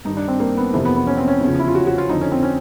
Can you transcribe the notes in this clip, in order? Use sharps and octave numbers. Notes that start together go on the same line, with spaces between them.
G2 D#3 D#4
D4
C4
A#3
B3
F2 C3 E3 A#3
B3
B3
C#4
C4
C#4
E2 C#3 F3
E4
F4
F#4
F#4
F4
F2 D3 F3 D#4
C#4
C4
C#4